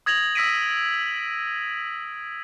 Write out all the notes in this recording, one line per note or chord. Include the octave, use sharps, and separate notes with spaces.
D#6 G#6 A#6 F7 F#7
D#6 E6 A#6 B6 D7 D#7